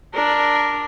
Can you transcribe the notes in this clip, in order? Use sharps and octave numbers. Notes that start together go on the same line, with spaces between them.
D4 A#4